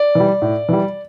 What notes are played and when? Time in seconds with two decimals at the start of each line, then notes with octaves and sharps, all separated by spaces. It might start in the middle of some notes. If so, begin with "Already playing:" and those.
Already playing: D5
0.15 E3 G3
0.42 A2
0.69 E3 G3